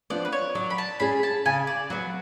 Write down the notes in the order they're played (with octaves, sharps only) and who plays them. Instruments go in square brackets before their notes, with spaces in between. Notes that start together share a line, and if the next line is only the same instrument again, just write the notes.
[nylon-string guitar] F3 B3 D4 [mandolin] D5
[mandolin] B4
C#5
[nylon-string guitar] F#3 [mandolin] D5
[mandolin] B5
A5
[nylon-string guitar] C#4 G#4 [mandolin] B5
[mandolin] A5
[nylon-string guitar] C#3 [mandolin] G#5
[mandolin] D5
[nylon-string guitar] F#3 B3 [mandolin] F#4